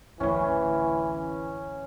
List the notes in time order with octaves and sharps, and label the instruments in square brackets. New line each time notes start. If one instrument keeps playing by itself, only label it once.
[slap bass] D1 A1 [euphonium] E3 [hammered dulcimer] C#4